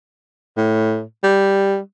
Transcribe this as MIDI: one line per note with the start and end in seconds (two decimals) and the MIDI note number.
0.57 1.02 45
1.23 1.78 55